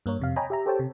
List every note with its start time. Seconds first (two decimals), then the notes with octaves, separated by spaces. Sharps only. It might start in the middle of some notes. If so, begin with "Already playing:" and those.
0.06 G2 A#3 A#4 C#5
0.19 F2 C3 F5
0.36 C#5 D#5 G5 G#5 A#5 B5
0.50 G4 E5 A#5
0.66 G4 A4 C5 C#5 G5 A5
0.79 C3